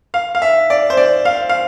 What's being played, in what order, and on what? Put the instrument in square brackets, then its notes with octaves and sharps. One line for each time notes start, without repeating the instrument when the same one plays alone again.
[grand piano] F5
F5
E5
D5
C5
D5
F5
F5